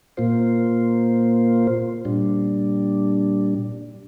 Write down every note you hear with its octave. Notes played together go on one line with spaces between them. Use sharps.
A#2 A#3 F4 C5
A#2 G3 D4